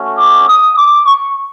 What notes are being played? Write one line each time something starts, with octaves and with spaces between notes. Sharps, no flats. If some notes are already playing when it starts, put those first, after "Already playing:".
Already playing: A3 C#4 F#4
D6
D#6
D6
C#6